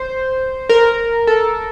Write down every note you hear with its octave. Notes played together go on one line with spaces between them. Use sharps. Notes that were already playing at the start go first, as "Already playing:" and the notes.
Already playing: C5
A#4
A4